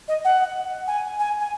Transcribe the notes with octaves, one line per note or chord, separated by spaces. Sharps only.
D#5
F#5
G#5
G#5
G#5